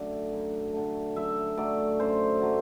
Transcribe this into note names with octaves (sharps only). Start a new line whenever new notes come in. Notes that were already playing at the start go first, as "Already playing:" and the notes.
Already playing: F#2 D3 A3 D5
F#2
D3 A3
F#2 E5
F#3 A3 D5
F#2 C5
F#3 A3